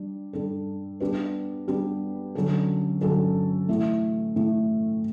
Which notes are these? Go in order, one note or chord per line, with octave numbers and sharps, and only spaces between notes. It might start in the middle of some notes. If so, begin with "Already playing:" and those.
Already playing: G3 D4
G3 D4 A4
G3 B3 D4 G4 B4
G3 B3 D4 G4 B4
D3 F#3 C#4 F#4 A4
D3 F#3 C#4 F#4 A4
A2 E3 A3
A2 E3 A3